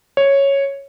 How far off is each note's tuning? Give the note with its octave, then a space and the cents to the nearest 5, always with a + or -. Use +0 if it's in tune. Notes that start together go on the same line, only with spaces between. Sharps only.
C#5 -5